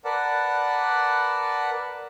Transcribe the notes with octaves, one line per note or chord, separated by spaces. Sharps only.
A#4 B4 D5 F#5 A5